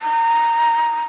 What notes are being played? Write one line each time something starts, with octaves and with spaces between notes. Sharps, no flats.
A#5